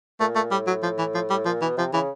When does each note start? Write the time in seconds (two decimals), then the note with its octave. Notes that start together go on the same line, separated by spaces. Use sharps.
0.20 A#2 A3
0.35 A3
0.51 A2 G3
0.67 F#3
0.83 F3
0.98 E3
1.14 F3
1.30 G3
1.45 A#2 F3
1.61 B2 E3
1.77 C3 F3
1.93 C#3 E3